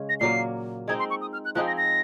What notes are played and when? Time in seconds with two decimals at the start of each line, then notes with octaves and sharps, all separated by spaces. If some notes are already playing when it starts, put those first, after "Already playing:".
Already playing: C#3 G#3 C#4 G#4
0.09 A#6
0.20 A#2 F#3 A#3 C7
0.88 G#3 C4 D#4 G#6
0.99 C6
1.10 C#6
1.21 D#6
1.33 F6
1.45 F#6
1.55 F3 C4 D#4 G#4 F#6
1.67 A#6
1.77 A#6